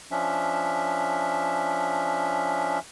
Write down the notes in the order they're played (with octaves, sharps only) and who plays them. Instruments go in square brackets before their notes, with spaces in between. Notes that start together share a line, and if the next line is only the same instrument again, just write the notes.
[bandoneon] F3 C#4 D4 E5